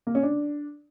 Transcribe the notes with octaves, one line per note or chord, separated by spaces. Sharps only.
A#3
C#4
D4